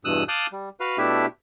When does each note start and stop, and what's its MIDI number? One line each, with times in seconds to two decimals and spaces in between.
0.05 0.23 40
0.05 0.23 43
0.05 0.23 47
0.05 0.23 87
0.05 0.23 88
0.05 0.23 90
0.28 0.46 77
0.28 0.46 81
0.28 0.46 86
0.28 0.46 87
0.28 0.46 90
0.28 0.46 91
0.52 0.69 55
0.80 0.97 66
0.80 0.97 71
0.80 0.97 77
0.98 1.26 47
0.98 1.26 57
0.98 1.26 62
0.98 1.26 64
0.98 1.26 67
0.98 1.26 76